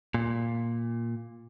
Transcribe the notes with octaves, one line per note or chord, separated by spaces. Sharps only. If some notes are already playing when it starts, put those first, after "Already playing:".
A#2